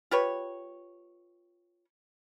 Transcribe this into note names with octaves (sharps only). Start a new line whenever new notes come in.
F4 G4 B4 C#5